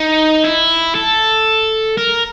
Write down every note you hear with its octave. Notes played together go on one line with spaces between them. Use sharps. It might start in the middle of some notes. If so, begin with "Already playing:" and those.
Already playing: D#4
E4
A4
A#4